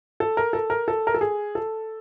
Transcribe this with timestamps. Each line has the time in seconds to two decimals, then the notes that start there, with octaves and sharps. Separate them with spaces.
0.20 A4
0.37 A#4
0.53 A4
0.70 A#4
0.88 A4
1.07 A#4
1.14 A4
1.21 G#4
1.55 A4